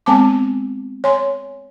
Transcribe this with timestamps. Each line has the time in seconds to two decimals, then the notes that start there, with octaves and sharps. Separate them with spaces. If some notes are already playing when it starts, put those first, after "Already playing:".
0.06 G#3 B3 C4 G#5 A5 D6
1.04 C#5 G#5 C6